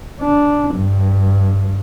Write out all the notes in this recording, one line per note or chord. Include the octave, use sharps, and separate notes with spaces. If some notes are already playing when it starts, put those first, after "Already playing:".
D4
G2